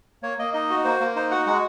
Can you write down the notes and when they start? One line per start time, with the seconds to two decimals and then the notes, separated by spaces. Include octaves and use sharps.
0.23 A#3 C#5
0.39 A#3 D#5
0.54 D#4 D#5
0.70 F#4
0.85 A#3 C5
1.01 A#3
1.16 D#4 C5
1.31 F#4 F#5
1.46 G#3 F#5